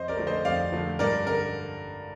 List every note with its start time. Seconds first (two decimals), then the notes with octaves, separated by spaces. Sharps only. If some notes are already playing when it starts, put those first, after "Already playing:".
Already playing: F2 C5 D#5
0.08 A#4 D5
0.17 D3 F3 A3
0.27 C5 D#5
0.45 F2 D5 F5
0.72 D3 F3 A3
0.99 G2 A#4 D5
1.26 D3 A#4